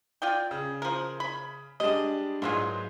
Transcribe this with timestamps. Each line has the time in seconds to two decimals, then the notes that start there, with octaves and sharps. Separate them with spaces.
0.22 F4 D5 G5
0.51 C#3
0.82 F3 A#4
1.20 B5
1.80 G3 G#3 D4 D#5
2.42 G#2 E3 F#3 G#3 A#3 F4